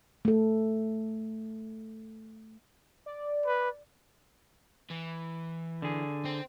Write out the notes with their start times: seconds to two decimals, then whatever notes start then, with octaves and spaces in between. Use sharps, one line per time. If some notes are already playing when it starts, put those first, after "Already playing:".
0.25 A3 A4
3.06 D5
3.46 B4
4.90 E3
5.82 D3 G#4
6.25 C4